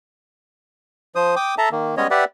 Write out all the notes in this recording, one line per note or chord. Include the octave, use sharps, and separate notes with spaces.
F3 C5 D#6
G5 D6 D#6
A4 E5 A5 A#5
D#3 A#3
G3 G#3 B3 C#4 C#5 D#5
G4 B4 D5 E5 F#5